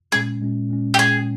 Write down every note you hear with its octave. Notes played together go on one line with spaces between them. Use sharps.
A#2 G#3 C#4 G#4
A#2 G#3 C#4
A#2 G#3 C#4
G4
A#2 G#3 C#4 G#4